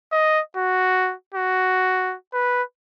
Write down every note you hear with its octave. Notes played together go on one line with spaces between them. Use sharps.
D#5
F#4
F#4
B4